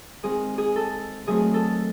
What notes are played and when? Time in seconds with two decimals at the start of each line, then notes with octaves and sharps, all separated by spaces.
0.23 D#3 G#3 C4 G#4
0.58 G#4
0.76 A4
1.27 D#3 F#3 A3 C4 G#4
1.54 A4